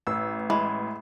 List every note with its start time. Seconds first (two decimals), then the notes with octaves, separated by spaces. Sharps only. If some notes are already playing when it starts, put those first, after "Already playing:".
0.07 A1 E6
0.50 E3 G#3